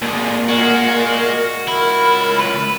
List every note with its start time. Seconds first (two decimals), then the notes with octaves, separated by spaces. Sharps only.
0.02 D#2 A#2 G#4
0.49 G#3 F#4 A#4
1.68 C#2 E4 A#4 B5
2.39 B4